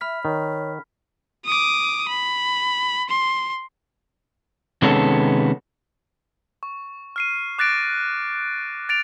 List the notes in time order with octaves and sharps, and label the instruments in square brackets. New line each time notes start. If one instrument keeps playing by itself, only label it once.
[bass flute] E5 [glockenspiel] B5 F6 B6
[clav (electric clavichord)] D#3 [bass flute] C#5
[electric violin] D6 D#6
B5
C6
[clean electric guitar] C3 D#3 G#3 B3 C#4 A4
[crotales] C#6
F6 C7 D#7
D6 F#6 A6 A#6 D7
A6 D7 F7